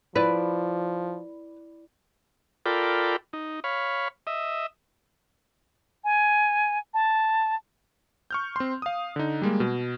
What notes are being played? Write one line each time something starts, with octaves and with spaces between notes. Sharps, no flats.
F3 E4 B4 D5
F4 A4 A#4 D5 G5 B5
D#4
C#5 F5 B5
D#5 E5
G#5
A5
C#6 F6 G6
C4 C6
F5 D#6
D3 D#4
G3 G#3 A#3
B2